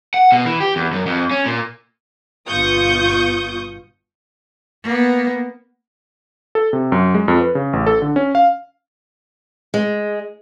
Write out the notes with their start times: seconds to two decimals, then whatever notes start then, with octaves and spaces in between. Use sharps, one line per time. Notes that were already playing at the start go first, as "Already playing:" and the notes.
0.14 F#5
0.32 B2
0.45 E3
0.60 G4
0.76 E2
0.93 F#2
1.06 F2
1.31 C#4
1.46 A#2
2.48 G1 B2 F4 C#6 D#6 G6
4.84 A#3 B3
6.55 A4
6.73 C3
6.92 F#2
7.14 G#3
7.28 F2
7.41 B4
7.55 C#3
7.73 A1
7.87 A4
8.02 D3
8.16 C#4
8.35 F5
9.74 G#3